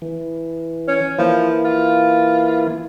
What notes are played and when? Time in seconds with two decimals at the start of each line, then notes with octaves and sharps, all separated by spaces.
0.02 E3
0.87 C#4
1.18 E3 F3 A#3 E4
1.65 F4